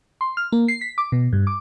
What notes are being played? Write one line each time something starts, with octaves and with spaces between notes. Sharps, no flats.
C6
F6
A#3
C7
B6
D6
B2
G2
D6